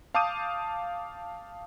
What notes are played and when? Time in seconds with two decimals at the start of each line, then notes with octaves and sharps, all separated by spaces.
0.14 F5 A5 D6 D#6 G6 D#7